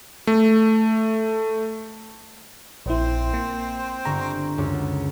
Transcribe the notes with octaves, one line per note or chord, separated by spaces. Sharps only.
A3
A#1 C4 E4 C5
A#3
G1 A#5 C#6
C#2 F#2